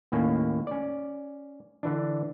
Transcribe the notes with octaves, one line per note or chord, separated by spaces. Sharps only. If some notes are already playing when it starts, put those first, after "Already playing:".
D#2 A2 A#3 C#4
C#4 D5
D3 E3 D4